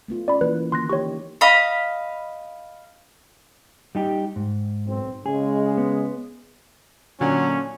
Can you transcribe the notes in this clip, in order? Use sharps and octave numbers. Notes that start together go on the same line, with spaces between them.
A3 B3 F4
C#4 D5 B5
E3 A#3 B4
D3 D#3 A#3 C6 F#6 A#6
D#4 F#4 G4 C#5 C#6
D#5 F5 B5
G3 D#4 G4
G#2
B1 C4
C#3 G#3 G#4
B3
A#2 D3 F#3 C#4